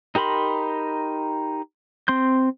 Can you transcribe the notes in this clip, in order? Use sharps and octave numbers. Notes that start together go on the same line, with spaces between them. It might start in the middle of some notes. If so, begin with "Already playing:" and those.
D#4 G4 A#4 B5 C6
C4 C6 G6